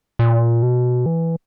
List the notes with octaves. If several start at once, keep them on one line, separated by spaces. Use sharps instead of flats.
A#2
B2
E3